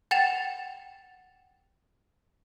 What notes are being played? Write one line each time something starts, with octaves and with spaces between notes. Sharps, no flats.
F#5 G5 A6 E7 F7